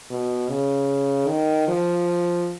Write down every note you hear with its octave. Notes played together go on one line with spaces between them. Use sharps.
B2
C#3
D#3
F3